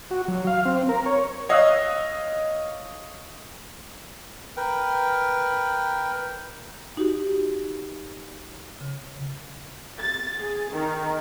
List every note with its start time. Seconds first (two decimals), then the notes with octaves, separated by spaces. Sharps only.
0.11 F#4
0.28 F#3
0.47 F5
0.65 C4
0.89 A#4
1.06 C#5
1.49 C#5 D#5 F5 D#6 E6 F#6
4.57 A#4 B4 G5
6.97 D#4 F#4 G4
8.81 C#3
9.99 A6
10.40 G#4
10.73 D#3